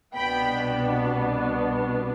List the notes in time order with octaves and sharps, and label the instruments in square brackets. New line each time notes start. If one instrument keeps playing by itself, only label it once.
[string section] C2 B2 B3 D4 G5 B5